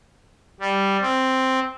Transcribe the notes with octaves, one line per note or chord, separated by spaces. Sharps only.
G3
C4